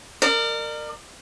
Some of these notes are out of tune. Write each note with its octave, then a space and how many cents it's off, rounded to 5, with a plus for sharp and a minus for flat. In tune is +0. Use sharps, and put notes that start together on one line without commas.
A#4 -15 D5 +40